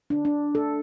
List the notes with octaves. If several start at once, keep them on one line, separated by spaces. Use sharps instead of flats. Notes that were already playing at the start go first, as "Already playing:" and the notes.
D4
D4
A4